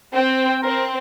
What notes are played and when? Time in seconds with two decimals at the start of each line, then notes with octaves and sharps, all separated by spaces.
0.14 C4 G5
0.63 C4 A#4